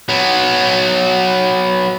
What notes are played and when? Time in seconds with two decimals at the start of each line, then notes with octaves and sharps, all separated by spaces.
0.09 F#3 B3